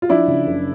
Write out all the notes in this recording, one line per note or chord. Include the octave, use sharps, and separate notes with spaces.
F4
F3 D4 E4
C#3
F#1